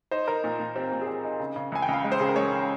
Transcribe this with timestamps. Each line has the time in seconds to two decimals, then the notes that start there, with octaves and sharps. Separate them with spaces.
0.11 D#4 C5
0.28 D#4 A#4
0.44 A#2
0.59 A#2
0.75 C4 G4
0.92 A#2
1.02 G#4
1.07 C4 G4
1.24 D#4
1.39 C#3
1.56 C#3
1.72 C#2 G#5
1.82 G5
1.88 C#2
1.94 F5
2.04 G#3
2.12 C5
2.20 C#3 G#4
2.29 A#4
2.36 G#3 C#5
2.52 C#3